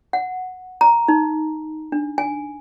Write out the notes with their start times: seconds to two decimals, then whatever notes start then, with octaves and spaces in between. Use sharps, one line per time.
0.13 F#5
0.81 A#5
1.08 D#4
1.92 D4
2.18 G#5